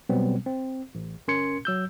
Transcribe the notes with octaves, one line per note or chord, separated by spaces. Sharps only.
B2 F#3 G3 B3 C4
C4
A1
G1 C#4 A#4 C6 G#6 C#7
F#3 E6 G6